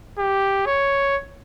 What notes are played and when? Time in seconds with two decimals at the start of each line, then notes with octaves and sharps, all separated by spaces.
0.18 G4
0.66 C#5